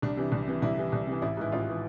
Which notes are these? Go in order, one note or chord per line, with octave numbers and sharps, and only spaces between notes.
C2 D4
C3 E3
C2
C3 E3
C2 E4
C3 E3
C2
C3 E3
A1 E4
G#2 E3 E4
A1 F4
E3